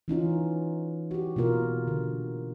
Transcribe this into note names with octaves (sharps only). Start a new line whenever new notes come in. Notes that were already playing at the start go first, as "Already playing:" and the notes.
E3 C#4 D#4 F4
F#4 G4
B2 A#3 F4 A#4
D3